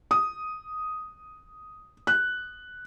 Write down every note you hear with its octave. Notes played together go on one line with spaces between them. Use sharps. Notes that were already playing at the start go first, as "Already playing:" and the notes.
D#6
F#6